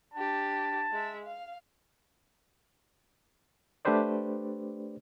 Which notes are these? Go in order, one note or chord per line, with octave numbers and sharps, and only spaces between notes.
D4 G4 A5
G#3 E5
F5
A3 D4 G4 B4 C5 D5